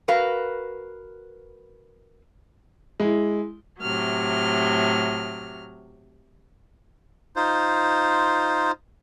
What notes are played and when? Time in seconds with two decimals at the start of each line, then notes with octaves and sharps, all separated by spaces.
0.08 F#4 A#4 B4 F5
3.00 G#3 E4
3.80 A2 C3 F#3 F6
7.36 D#4 F4 C5